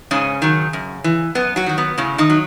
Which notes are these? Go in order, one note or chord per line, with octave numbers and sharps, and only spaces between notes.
G#2 C#3 C#4
D#3 F#3
F#2
E3
F#2 B3
F#3 F#4
D#3 F#3
B3
A2 C#3 C#4
D#3 D#4
F#3